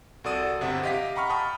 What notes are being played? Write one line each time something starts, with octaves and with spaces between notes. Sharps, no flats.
C2 F#4 A4 D5 D#6 D#7
G1 C3 E5 F#5
G4 D#5 F5 B6
F#5 A#5 B5 C#6 F6
G5 A5 B5 C#6 D#6